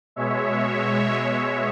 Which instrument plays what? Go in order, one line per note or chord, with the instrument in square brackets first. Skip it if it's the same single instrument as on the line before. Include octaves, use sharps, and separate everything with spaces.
[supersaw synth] B2 G#3 C#5 E5